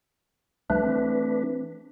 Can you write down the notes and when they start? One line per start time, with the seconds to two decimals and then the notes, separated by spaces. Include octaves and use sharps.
0.70 C#2 F3 G3 A3 D4 B4
0.83 E3 C4